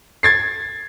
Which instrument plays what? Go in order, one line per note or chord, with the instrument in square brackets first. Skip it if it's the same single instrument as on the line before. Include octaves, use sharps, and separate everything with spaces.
[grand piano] G#6 A6 C7